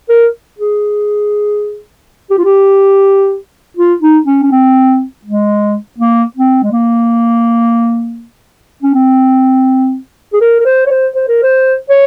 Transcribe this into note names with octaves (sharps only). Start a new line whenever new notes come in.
A#4
G#4
G4
F4
G4
F4
D#4
C#4
C#4
C4
G#3
A#3
C4
G#3
A#3
C#4
C4
G#4
A#4
A#4
C5
C#5
C5
C5
A#4
C5
C#5